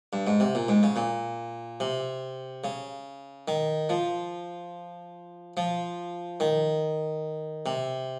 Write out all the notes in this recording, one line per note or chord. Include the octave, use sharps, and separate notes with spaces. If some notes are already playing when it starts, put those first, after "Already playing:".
G2
G#2
C3
A#2
G#2
C#3
A#2
C3
C#3
D#3
F3
F3
D#3
C3